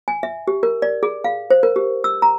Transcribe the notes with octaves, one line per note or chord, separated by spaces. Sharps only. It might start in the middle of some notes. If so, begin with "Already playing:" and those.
G#5
E5
G4
A#4
D5
G#4
F5
C5
A#4
G4
E6
A#5